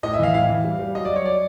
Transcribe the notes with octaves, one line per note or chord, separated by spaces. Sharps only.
A2 D#5
E5
E3 F5
A2 F5
E3
G3
G3
F#3 D#5
D5
F#3
C#5
D5